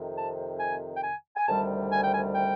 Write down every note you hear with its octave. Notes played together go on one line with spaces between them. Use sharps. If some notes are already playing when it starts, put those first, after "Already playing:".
Already playing: F2 C3 D#3
A5
G#5
G5
G#5
G#5
D2 C3 D#3 G3 A5
G#5
G5
G#5
G5